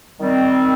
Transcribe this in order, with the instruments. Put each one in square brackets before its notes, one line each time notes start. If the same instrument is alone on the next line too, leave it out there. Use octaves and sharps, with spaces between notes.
[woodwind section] D#3 G3 C4